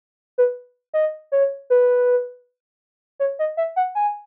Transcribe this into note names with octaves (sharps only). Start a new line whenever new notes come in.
B4
D#5
C#5
B4
C#5
D#5
E5
F#5
G#5